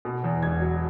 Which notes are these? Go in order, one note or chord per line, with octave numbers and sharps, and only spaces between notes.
B2
E2
E1 G#6
F#3